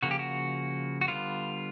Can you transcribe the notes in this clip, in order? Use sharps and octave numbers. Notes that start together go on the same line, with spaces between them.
C#3 F3 A#3 F#4
G4
F#4
F#4
D3 G3 B3 F4